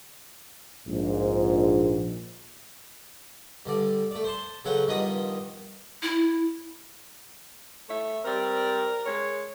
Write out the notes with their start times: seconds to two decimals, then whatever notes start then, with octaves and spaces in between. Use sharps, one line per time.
0.87 A#1 G#2 F3
3.66 G2 D3 D5
4.11 A3 D5
4.24 C5 A5 C6
4.65 C#3 F#3 A4 B4 F#5 G5
4.87 G2 D#3 F3 B3 D#5 D#6
6.02 E4
7.88 A3 C#5 E5
8.25 G3 C4 A#4 D5
9.06 G#3 C#5